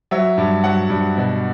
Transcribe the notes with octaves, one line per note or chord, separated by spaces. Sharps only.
F#3 E5
G2
F#3 F#5
G2
B2